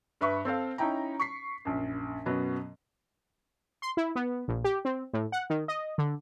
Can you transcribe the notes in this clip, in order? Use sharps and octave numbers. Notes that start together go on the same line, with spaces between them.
G2 B4 E5 C#6
C4 A4 C5 F5
C#4 D#4 E4 G5 A#5
C#6 B6 C7
A#1 F#2
F#2 B2 F#3 B3
C6
E4
B3
A#1
G4
C4
A2
F#5
D#3
D#5
D3